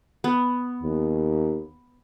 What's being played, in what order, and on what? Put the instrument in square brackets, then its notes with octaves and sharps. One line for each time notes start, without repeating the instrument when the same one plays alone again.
[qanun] B3
[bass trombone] D#2